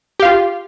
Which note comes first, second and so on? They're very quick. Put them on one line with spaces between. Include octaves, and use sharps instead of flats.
G4 F5 F4